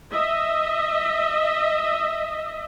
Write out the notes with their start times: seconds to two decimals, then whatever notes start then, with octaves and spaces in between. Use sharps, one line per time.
0.11 D#5 E5